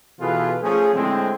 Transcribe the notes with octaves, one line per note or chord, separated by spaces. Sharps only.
B2 E3 F4 G#4 A4 B4
F3 A3 C#4 G#4
A2 D3 G#3 A3 C4